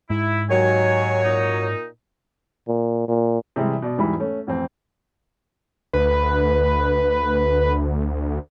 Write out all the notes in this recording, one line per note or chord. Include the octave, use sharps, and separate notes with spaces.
G#2 E4
D#2 D#3 F#3 C#5 G#5
A#2 D#4
A#2
A#2
C3 E3 G3 G#3
B2 D5
E1 G#2 E3 G3 B5
A3 C#4
A1 F2 C4
D2 B4